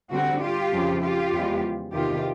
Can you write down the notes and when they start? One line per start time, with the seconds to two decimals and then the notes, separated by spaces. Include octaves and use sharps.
0.11 D3 G3 C4 F#4
0.41 F4 G4
0.71 F2 C#3 F3
1.01 F4 G4
1.33 E2 C#3 F3 G#3
1.93 E2 C3 D#3 F4 G4